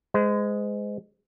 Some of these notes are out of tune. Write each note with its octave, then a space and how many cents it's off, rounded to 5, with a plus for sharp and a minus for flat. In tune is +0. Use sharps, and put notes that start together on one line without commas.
G#3 +0 C5 -35